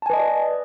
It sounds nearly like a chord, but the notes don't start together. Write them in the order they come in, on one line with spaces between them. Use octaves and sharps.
A5 G#5 B4 D#5 D5